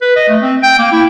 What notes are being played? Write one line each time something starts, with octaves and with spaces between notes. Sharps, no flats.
B4
D#5
A3
C4
G5
A#3
E4